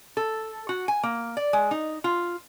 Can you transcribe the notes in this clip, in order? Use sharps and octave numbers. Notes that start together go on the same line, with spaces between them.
A4
F#4
G#5
A#3
D5
G#3
D#4
F4